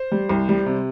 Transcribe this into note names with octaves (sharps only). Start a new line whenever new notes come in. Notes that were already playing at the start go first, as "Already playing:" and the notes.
Already playing: C5
G3
C2
G3
C3